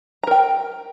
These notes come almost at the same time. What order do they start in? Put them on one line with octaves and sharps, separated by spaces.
A#5 A#4 G5